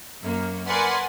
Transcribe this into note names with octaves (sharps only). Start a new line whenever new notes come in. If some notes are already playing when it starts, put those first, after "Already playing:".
F#2 A#3
A#4 B4 D5 F#5 G#5 C6